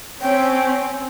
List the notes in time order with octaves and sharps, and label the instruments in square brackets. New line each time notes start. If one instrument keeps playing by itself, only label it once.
[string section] C4 C#4 [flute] G5